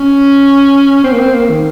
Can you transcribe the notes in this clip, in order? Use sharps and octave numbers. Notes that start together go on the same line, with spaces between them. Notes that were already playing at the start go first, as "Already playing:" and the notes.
Already playing: C#4
C4
A#3
C4
A#3
D#3